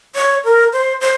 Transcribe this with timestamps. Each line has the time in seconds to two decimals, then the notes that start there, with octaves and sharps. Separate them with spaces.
0.15 C#5
0.44 A#4
0.73 C5
1.01 C5